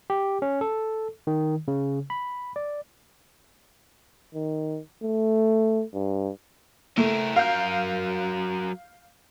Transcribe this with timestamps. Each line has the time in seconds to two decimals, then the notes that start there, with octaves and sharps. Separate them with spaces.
0.10 G4
0.42 C#4
0.61 A4
1.27 D#3
1.68 C#3
2.10 B5
2.56 D5
4.35 D#3
5.04 A3
5.94 G2
6.97 A3 E4 A#4
7.36 F#3 A#4 F5 G6